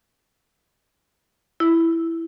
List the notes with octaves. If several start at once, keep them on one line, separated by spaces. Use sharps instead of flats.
E4